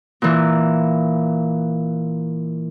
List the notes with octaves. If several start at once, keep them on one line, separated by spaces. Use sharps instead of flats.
A#2 E3